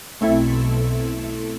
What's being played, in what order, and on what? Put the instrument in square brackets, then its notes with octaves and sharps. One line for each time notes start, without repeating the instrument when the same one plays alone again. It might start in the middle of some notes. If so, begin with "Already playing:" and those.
[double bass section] B1 B2 [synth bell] A3 C4 E4 A4 E5